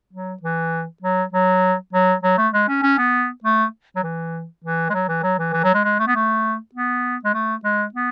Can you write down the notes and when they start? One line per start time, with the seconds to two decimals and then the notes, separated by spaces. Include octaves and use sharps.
0.13 F#3
0.42 E3
1.02 F#3
1.33 F#3
1.93 F#3
2.23 F#3
2.38 A3
2.53 G#3
2.69 C#4
2.83 C#4
2.98 B3
3.44 A3
3.96 F#3
4.03 E3
4.64 E3
4.90 G#3
4.94 F#3
5.09 E3
5.23 F#3
5.39 E3
5.53 E3
5.64 F#3
5.74 G#3
5.84 G#3
5.99 A3
6.07 B3
6.15 A3
6.75 B3
7.25 G#3
7.34 A3
7.64 G#3
7.94 B3